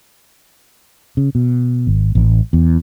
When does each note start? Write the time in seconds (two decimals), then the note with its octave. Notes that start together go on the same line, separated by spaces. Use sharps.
1.17 C#3
1.35 B2
1.87 G#1
2.15 A1
2.53 E2